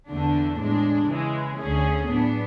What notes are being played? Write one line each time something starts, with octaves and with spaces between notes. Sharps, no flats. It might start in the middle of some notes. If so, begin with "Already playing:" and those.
E2 D3 A3 D4
A2 G#3 D4
C#3 E3 G#3
D2 D3 A3 C#4 G#4
A2 F#3 B3 D4